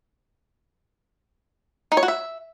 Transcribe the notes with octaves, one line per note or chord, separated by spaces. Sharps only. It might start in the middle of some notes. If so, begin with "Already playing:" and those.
D#4
C#5
F#4
E5